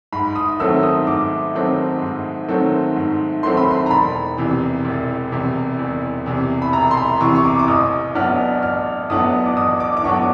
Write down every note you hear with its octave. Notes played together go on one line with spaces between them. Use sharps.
G#2 B5
D#6
D#3 F#3 A3 C4 E6
D#6
G#2 D6
D#3 F#3 A3 C4
G#2
D#3 F#3 A3 C4
G#2
D#3 F#3 A3 C4 C6
B5
C6
A#5
E1 B5
E2 C3 E3
E1
E2 C3 E3
E1
E2 C3 E3
B5
E1 A#5
C6
B5
E2 C3 E3 C#6
C#6
D6
D6
A1 D#6
A2 F#3 B3 D4 F6
A1 F6
A2 F#3 B3 D4 D#6
D6
A1 D#6
D6
D6
A2 F#3 B3 D4 C#6